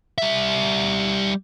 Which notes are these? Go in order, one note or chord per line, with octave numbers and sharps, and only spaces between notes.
G3 E5